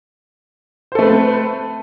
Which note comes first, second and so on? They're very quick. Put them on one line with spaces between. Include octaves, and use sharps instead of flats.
C5 A4 A3 B4 C4